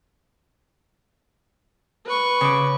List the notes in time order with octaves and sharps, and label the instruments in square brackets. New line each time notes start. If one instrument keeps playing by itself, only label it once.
[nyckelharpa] B4 C#6
[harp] C#3 D6